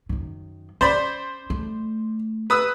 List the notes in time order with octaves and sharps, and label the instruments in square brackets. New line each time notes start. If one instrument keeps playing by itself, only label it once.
[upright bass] F#2 D#3
[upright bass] C#4 [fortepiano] C5 D5 B5
[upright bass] A3
[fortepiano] B4 D#6 E6